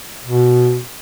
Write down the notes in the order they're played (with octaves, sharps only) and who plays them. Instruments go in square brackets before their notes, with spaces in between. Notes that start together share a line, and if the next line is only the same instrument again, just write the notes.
[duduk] B2